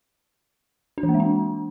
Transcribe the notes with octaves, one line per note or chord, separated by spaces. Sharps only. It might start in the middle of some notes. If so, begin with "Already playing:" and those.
D4
E3
A#3
G#3
D4